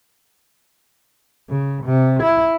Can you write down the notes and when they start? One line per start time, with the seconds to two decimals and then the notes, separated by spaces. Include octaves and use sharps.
1.50 C#3
1.85 C3
2.23 E4